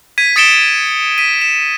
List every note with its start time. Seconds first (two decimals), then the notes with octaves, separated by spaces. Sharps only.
0.18 G#6 B6 D#7
0.36 D#6 A6 C#7 D7 E7 G7
1.18 B6 D#7
1.42 E7